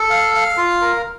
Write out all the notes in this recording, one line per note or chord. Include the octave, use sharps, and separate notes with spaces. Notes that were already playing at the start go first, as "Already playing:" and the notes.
Already playing: A4
F5
F5
F4
A#4